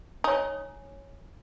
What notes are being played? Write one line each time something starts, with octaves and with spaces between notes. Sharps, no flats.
D#4 C#5 G#5